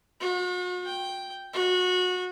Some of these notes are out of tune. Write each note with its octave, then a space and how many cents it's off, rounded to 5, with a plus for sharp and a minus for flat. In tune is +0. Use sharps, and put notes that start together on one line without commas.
F#4 -45
G5 +0
F#4 -25